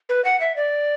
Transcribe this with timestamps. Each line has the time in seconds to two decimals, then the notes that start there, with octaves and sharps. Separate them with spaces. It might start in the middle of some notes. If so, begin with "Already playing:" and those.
0.09 B4
0.25 F#5
0.41 E5
0.56 D5